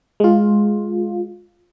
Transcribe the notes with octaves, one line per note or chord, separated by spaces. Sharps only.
G#3 F4